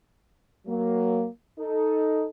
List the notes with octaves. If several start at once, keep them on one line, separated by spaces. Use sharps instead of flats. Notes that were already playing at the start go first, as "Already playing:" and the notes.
F#3 A#3
D#4 A4